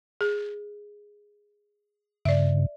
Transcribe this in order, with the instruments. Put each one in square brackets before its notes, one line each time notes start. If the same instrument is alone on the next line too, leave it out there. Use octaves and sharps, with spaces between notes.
[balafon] G#4
[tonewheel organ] G2 C#3 [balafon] D5 E5